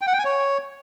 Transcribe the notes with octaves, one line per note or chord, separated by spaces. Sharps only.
G5
F#5
G5
G#5
C#5